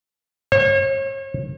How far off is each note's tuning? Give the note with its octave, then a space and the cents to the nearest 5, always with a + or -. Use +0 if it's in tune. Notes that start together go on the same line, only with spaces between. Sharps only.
C#5 -40